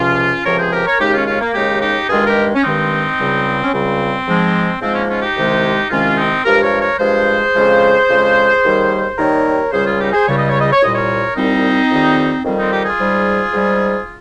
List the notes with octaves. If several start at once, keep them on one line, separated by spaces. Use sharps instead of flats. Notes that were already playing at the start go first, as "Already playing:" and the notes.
Already playing: C#2 C3 F3 C#4 F4
C#2 C3 F3 A#4 C#5
G#4 C5
G4 A#4
A#4 C#5
D#2 C#3 G#3 D#4 G4
C#4 F4
C#4 F4
A#3
D#2 C#3 G#3 D#4 G4
D#4 G4
G2 D#3 G#3 F4 G#4
G4 A#4
C#4
G2 D#3 G#3 C4 D#4
C#2 C#3 G3
C#4
C#2 C#3 G3 C4
G#2 F3 G#3
G#2 F3 G#3 C4
A#3 C#4
C#4 F4
D#4 G4
C2 C3 D#3 G#3
C2 C3 D#3 G#3 C#4 F4
C4 D#4
G2 F3 G#3 G4 A#4
A#4 C#5
A#4 C#5
G2 F3 G#3 G#4 C5
F2 C#3 F3 G#3
F2 C#3 F3 G#3
D#2 D#3 G3
D#2 D#3 G3 A#4 C#5
C#2 C#3 G3 G#4 C5
F4 G#4
D#4 G4
G#4 C5
C#2 C#3 G3 C#5
D#5
C#5
D#5
C#5
C2 A#2 G3 D#5
A#4 C#5
C2 A#2 G3 C4 D#4
F2 D#3 G3
F2 D#3 G3 C4
C4 D#4
D#4 G4
F4 G#4
G#2 G3
G#2 G3